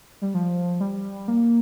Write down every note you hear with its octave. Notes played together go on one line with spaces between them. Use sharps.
G3
F3
G3
A#3